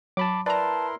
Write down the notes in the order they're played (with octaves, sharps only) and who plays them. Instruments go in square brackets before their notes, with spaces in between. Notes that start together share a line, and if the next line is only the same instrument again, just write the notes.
[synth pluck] F#3 [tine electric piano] A5 B5 D6
[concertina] E4 A#4 C6 [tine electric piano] B4 [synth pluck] D5 A#5 [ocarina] A5